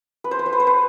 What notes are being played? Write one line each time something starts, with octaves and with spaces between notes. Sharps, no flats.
B4
C5
B4
C5
B4
C5
B4